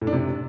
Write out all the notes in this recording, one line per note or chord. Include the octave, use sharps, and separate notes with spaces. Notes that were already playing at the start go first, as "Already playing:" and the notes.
A2
D4
C3